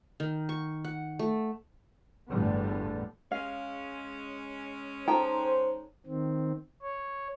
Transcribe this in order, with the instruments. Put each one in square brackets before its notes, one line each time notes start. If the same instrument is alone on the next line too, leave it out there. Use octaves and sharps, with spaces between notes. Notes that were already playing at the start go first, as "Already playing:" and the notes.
[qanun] D#3
C#6
F#5
A3
[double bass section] G1 E2 A2 D3 G3 B3
[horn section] G#3 C#4 [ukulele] F5
[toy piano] D#4 A4 A#5 [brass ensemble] C5 [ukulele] G5
[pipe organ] D#3 C4
C#5